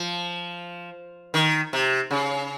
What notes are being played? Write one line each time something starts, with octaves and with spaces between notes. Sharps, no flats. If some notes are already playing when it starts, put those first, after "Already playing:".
Already playing: F3
D#3
C3
C#3